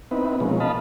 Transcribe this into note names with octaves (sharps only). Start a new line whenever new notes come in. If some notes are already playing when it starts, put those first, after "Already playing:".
B3 C4 D#4 E4 B4
B2 F3 G#3 A#3 C#4
D#5 F5 A5 B5